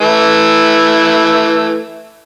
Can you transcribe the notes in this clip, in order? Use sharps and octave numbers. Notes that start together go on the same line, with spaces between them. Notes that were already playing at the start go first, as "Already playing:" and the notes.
E3 A3 E4